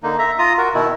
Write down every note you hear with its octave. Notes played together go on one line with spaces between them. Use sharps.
D3 A#3 D#4
E5 A#5
F4 A#5 D#6
F#4 A#4
B2 D#3 E4